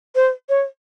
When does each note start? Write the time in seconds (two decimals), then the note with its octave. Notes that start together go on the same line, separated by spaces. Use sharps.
0.15 C5
0.49 C#5